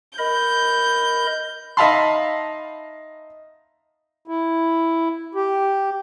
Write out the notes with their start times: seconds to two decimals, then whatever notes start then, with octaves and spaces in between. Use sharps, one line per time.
0.18 A#4 D#5 B5 G6
1.77 D#4 E5 F5 A5 B5 C6
4.28 E4
5.35 G4